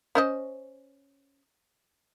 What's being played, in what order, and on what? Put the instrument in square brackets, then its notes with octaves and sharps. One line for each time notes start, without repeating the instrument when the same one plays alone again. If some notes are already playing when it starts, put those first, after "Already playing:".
[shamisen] C#4 C5 D#5